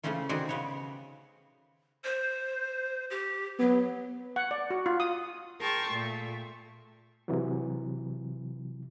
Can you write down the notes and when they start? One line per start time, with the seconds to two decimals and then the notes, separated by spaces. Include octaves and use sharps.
0.03 C#3 E3 A3 C4 C#4 F4
0.29 C3 D#3 C4 F#4 G#4 D5
0.49 C#3 B3 C#5
2.04 C5
3.10 G4
3.59 F#3 B3
4.36 F#5
4.51 D5
4.70 F#4
4.86 F4
5.00 D#6
5.59 G#4 A#4 G5 A5 C6 C#6
5.89 A#2 A3
7.28 C3 E3 F#3